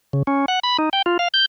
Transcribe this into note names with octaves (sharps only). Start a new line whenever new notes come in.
C#3
C#4
F#5
B5
D#4
G5
F4
F5
G6